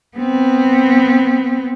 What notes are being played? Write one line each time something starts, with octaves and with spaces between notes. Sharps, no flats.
B3 C4